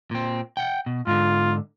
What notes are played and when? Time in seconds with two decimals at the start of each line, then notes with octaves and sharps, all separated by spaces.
0.11 A#2 C4
0.57 F#5 G5
0.86 B2
1.07 G#2 D3 F4